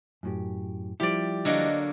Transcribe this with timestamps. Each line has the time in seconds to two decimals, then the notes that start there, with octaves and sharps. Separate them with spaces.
0.23 F#2 A2 G4
1.00 F3 G3 E4 G4 D5
1.45 D3 F#3 A#3 D#5